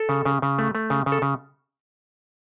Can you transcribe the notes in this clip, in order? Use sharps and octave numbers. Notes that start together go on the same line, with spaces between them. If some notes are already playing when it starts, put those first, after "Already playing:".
Already playing: A4
C#3
C#3
C#3
A3
A3
C#3
C#3
A4
C#3